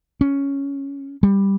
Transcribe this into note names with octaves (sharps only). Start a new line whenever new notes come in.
C#4
G3